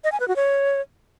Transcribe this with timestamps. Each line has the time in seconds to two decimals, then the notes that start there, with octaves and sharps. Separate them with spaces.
0.04 D#5
0.12 G#5
0.20 B4
0.28 F#4
0.36 C#5